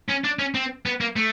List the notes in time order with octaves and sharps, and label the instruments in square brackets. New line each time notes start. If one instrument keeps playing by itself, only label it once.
[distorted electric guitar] C#4
D4
C#4
C4
B3
A#3
A3